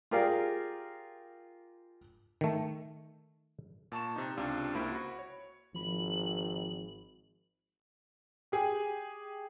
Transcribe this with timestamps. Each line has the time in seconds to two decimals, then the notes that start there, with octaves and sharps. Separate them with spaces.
0.11 F4 G4 G#4 A#4 D5 F5
2.41 D#3 A3
3.92 A#2 A5 C#6 E7
4.16 C3 D#4
4.37 C#2 C3 D4 F4
4.75 C#2 A#3 E4 C5 B5 D7
4.92 F#4 B5
5.19 C#5
5.75 G#1 F3 B5 F#7
8.52 G4 G#4 G#5